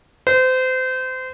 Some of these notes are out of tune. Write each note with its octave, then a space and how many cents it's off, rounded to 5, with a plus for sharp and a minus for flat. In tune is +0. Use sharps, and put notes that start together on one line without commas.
C5 -30